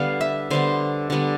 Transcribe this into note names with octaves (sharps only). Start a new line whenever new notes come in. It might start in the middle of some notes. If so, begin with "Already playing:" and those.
Already playing: D3 G3 B3 F5
E5
D3 G3 B3 C5
D3 G3 B3